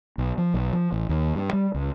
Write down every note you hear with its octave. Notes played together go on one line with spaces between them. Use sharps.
B1
F3
B1
F3
A1
D#2
G2
G3
C#2